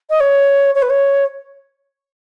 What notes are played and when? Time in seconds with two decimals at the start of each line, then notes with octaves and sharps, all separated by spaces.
0.10 D#5
0.20 C#5
0.75 C#5
0.82 B4
0.90 C#5